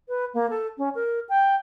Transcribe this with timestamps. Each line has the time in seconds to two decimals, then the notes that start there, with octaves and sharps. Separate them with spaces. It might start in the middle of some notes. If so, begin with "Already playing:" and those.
0.08 B4
0.34 A#3
0.50 A4
0.78 C#4
0.95 A#4
1.29 G5